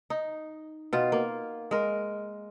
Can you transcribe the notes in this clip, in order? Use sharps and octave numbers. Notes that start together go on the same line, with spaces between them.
D#4
B2 F4
A#3
G#3 A#4